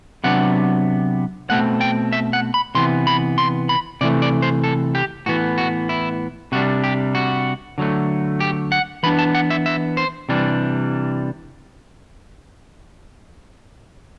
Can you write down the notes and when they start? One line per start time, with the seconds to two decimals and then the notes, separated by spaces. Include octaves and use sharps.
0.24 C3 F#3 B3 D4 F#5
1.50 B2 A3 C4 F#5
1.81 G5
2.12 E5
2.33 F#5
2.54 B5
2.75 C3 E3 B3 C6
3.07 B5
3.38 C6
3.69 B5
4.01 C3 E3 A3 D5
4.22 D5
4.42 C5
4.64 A4
4.95 G4
5.26 A2 E3 B3 F#4
5.58 F#4
5.89 E4
6.52 C3 G3 D4 F#4
6.84 G4
7.15 F#4
7.78 D3 F#3 A3
8.40 G4
8.72 F#5
9.03 E3 B3 D4 B5
9.19 A5
9.35 F#5
9.50 E5
9.66 E5
9.97 C5
10.29 C3 E3 G3 D4